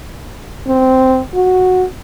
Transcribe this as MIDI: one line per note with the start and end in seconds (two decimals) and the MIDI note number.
0.68 1.22 60
1.35 1.86 66